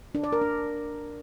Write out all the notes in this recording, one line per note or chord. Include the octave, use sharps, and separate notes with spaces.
D4
D5
A#4
D4